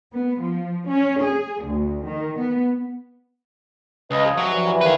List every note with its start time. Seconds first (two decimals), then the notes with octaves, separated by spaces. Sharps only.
0.13 B3
0.42 F3
0.88 C#4
1.23 G#4
1.64 D2
2.06 D#3
2.38 B3
4.11 C#2 B4 D#5
4.24 F3 G#4
4.38 F#3 E5 G#5
4.51 G2 F3
4.67 E3
4.81 D#2 D#3 G#4 B4